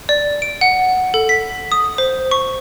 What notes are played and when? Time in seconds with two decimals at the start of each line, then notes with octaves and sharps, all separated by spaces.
0.09 D5
0.42 D7
0.61 F#5
1.14 A4
1.29 B6
1.72 D#6
1.98 C5
2.31 C#6